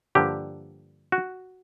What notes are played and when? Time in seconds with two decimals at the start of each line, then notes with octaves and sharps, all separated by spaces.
0.15 G2 D3 F3 A#3 G4
1.12 F#4